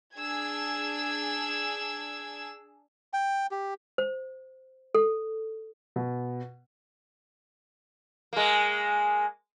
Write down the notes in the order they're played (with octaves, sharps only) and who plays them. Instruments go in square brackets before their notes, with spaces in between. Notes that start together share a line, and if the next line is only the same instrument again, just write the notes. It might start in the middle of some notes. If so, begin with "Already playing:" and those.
[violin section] D4 G#4 E6 G#6
[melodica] G5
G4
[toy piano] C5
A4
[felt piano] B2
[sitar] G#3 A#3